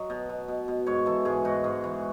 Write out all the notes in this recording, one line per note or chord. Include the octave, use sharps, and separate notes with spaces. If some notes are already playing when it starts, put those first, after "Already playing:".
Already playing: F#3 C#5 D#5
B2
B2
B2
B2
G#2 C#5
E3 A4
G#2 G#4
G#2 F#4
G#2
E3